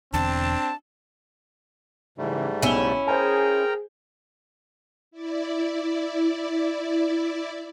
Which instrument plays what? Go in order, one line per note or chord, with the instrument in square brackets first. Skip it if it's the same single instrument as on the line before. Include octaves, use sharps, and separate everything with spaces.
[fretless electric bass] E1 E2 D3 [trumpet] C4 [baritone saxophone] D4 [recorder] A5
[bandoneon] G#2 G3 A3 [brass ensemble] C#3 E3
[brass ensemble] F#1 A2 [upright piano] B1 G7 [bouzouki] C#4 E4
[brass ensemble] G#4 [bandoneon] A#4 G5 A#5 [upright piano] C5 G#5
[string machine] E4 D5